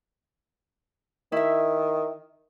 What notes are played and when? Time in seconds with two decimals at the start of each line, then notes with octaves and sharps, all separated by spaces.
1.32 D#3 E4 E5